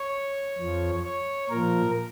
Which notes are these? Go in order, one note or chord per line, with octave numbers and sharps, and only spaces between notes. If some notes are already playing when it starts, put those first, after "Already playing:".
Already playing: C#5
F2 F3
C#5
A#2 F3 A#4